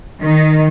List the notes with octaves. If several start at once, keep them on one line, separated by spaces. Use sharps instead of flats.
D#3